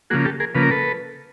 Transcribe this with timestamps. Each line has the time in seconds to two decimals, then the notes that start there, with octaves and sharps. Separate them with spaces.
0.10 C#3 F3 A#3 F#4 G#4
0.25 G4 A4
0.40 G#4 A#4
0.55 C#3 F3 A#3 B4
0.63 A#4
0.71 A4 B4